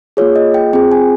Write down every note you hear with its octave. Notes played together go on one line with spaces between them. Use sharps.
A#3 F4 G#4 C#5
D#5
G5
C4 F4 G#4 G5
G#5